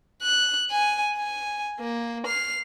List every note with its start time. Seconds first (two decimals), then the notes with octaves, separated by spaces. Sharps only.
0.22 F#6
0.71 G#5
1.16 G#5
1.80 A#3
2.26 F6 C7